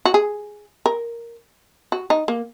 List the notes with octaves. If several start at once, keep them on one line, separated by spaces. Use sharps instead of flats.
F#4
G#4
A#4
F#4
D#4
A#3